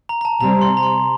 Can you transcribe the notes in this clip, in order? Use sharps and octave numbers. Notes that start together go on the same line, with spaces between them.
A#5
A#5
A5
C3 G3 C4 A#5
C6
A#5
C6